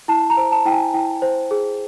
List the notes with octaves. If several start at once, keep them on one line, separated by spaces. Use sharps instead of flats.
E4 A5
A#5
C5
A5
E4 G5
G#5
E4 G5
C5
G#4